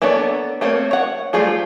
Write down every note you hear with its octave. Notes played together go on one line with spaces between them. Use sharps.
A#3 B3 D4 A4 C#5
A3 A#3 C4 C#5
C#5 F#5
G3 A3 F4 G#4 C5